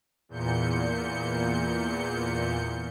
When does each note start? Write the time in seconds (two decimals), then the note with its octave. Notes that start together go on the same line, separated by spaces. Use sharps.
0.29 E2 A#2 G6 C#7